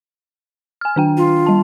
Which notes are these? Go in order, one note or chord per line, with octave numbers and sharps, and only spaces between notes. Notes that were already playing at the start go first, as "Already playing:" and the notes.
G#5 F6
D#3 D4 G5
F4
G3 A5